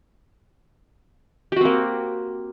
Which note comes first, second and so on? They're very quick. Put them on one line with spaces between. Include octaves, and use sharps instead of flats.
G4 F#4 C4 A#3